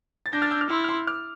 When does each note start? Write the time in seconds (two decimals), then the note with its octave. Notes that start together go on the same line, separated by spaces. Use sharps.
0.26 A6
0.33 D4 G6 A#6
0.42 F6 A6
0.51 E6 G6
0.61 D6 F6
0.70 E4 C6 E6
0.84 F6
0.89 C6 E6
1.07 D6 F6